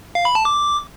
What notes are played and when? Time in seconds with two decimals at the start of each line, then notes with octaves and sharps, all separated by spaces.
0.15 F5
0.25 B5
0.35 A5
0.45 D6